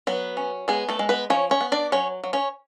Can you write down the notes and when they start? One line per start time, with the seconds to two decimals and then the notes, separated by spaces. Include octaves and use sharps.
0.07 F#3 B3 B4
0.37 C#4
0.68 G#3 B3 G#4
0.89 A3 A4
0.99 G#3
1.09 B3 B4
1.30 F3 C#4 C#5
1.51 C#4 C#5
1.61 B3
1.72 D4 D5
1.92 F#3 C#4 C#5
2.24 F#3
2.33 C#4 C#5